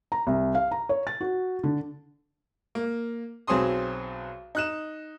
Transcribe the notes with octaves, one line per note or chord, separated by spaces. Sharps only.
A#5
C2
F5
A#5
C#5
A6
F#4
D3
A#3
B1 F#3 C4 G#4 C6 D#6
D#4 F#6 E7